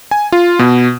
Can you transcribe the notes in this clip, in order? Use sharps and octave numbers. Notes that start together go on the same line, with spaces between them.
G#5
F4
B2